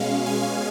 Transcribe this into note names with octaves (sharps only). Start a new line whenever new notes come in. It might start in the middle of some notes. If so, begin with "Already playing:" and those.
Already playing: B2 G#3 C#4 F5
G#5